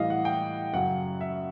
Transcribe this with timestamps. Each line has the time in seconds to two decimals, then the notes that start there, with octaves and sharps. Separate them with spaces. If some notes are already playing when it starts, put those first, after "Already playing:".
Already playing: A2 E3 G3 D#5 F5
0.10 F#5
0.25 G5
0.73 F#2 C#3 F#3 F#5
1.21 E5